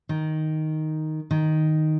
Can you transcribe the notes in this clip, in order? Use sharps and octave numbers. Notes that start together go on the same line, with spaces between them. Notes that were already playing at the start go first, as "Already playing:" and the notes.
D#3
D#3